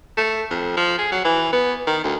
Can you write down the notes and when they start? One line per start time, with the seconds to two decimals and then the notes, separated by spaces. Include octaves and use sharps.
0.17 A3
0.50 F2
0.77 F3
0.98 G#4
1.12 F#3
1.24 E3
1.53 B3
1.87 D#3
2.04 D2